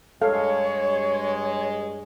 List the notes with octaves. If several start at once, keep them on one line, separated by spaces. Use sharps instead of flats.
G2 G#3 A4 C#5 F5